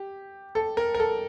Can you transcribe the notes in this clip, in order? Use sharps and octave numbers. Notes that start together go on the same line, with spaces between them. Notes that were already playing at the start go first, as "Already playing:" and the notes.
Already playing: G4
A4
A#4
A#4
A4